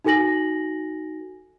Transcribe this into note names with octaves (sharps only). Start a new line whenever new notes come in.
D#4 F#4 A4 G#5 A#6 F#7